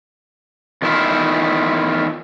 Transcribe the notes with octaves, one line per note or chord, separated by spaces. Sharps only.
E2 D#3 A3 E4 F4